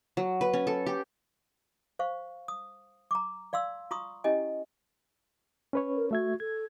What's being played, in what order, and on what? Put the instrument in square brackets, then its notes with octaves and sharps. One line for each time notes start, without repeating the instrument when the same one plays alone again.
[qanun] F#3
B4
C#4
A4
G4
[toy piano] C5 F5 C#6
D#6
A#5 D6
D5 F5 C6 E6
F4 A#5 C6 C#6 D#6
C#4 E4 G4 D#5 G#5
[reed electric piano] C#4 B4 C#5
[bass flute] A#4
[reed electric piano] A3 E5 G#6 [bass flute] F#4
[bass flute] A4 [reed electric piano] G#6